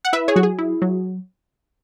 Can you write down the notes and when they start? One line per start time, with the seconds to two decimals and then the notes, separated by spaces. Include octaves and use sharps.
0.05 F#5
0.13 E4 B4 E5
0.28 G#4 C#5
0.36 F#3 F#4
0.43 G#4
0.59 E4
0.82 F#3